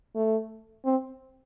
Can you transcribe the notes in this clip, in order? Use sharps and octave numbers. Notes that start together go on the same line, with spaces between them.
A3
C4